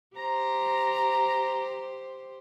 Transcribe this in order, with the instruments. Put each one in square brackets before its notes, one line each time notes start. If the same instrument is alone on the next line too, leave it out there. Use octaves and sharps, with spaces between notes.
[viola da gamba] G4 C5 [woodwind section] A#5